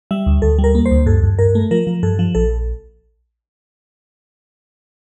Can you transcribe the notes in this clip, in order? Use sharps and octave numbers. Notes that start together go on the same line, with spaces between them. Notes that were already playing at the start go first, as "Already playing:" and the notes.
G3 E5
D2
D2 A4
G3
A#4
A#3
C5
D2
G2 A4
G2
G2 A#4
A3
F3 A#4
F3
G2 A4
F3
A#1 A4